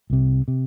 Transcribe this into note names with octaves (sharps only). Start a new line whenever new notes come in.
C2 C3
C3